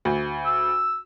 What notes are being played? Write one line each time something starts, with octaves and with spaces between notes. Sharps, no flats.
D2
E6